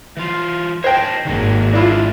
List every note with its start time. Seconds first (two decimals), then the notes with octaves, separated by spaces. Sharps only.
0.17 E3 F4
0.84 C5 C#5 D#5 G5 A5
1.25 G#1 D#3 F#3 A#3
1.73 G#3 D4 E4 F4 D5 F5